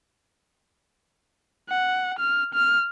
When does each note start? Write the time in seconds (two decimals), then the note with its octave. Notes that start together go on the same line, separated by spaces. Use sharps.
1.69 F#5
2.19 F6
2.54 F6